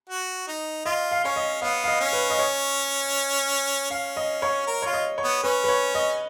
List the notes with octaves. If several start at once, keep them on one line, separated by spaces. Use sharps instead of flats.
F#4
D#4
F4 D#5
F5
C#4 C#5
D#5
B3 F5
F5
D#5
C#4
B4
D#5
C#5
C#4 F5
D#5
C#5
A#4
F4 C#5
D#5
C#5
B3
C#4 B4
B4
C#5
D#5